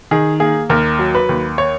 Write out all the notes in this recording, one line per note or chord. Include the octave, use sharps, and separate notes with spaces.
D#3 G#4
A#3 G#4
D#2 A#4
F#3
B4
D#2
C#5